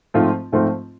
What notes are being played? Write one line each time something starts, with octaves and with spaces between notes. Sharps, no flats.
G#2 F3 A3 C4 F4
G#2 F3 A3 C4 F4